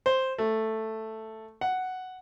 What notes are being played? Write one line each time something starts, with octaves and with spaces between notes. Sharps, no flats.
C5
A3
F#5